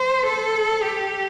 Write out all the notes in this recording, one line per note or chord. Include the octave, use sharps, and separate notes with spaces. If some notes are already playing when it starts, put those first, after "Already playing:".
Already playing: C5
A4
G4